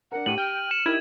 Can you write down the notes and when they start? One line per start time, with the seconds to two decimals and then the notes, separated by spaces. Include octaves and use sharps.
0.12 D4 A#4 F#5
0.26 A2 G4 D#7 F#7
0.38 G5 F6
0.71 C#7 E7
0.86 D#4 E4 G4 A#4 G#6